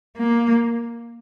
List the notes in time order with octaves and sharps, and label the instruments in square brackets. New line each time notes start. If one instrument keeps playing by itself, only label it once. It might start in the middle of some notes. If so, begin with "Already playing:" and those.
[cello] A#3